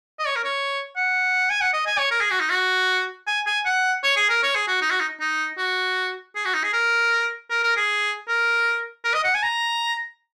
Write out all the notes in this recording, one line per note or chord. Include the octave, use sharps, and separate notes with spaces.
D#5
C#5
A#4
C#5
F#5
G#5
F#5
D#5
G#5
C#5
A#4
G#4
F#4
D#4
F#4
G#5
G#5
F#5
C#5
G#4
A#4
C#5
G#4
F#4
D#4
F#4
D#4
D#4
F#4
G#4
F#4
D#4
G#4
A#4
A#4
A#4
G#4
A#4
A#4
D#5
F#5
G#5
A#5